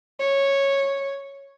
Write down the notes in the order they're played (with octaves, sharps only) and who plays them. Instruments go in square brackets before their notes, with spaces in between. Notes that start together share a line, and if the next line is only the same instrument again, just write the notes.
[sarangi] C#5